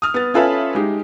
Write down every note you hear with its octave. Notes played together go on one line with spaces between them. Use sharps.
D#6 F6
B3 A6
C#4 F4 A4 B4 E5 G#5
G#3 D#4 G4